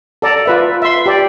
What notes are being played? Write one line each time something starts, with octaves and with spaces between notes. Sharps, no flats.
A4 D5 A#5
F4 B4 E5
E5 C6
G4 D5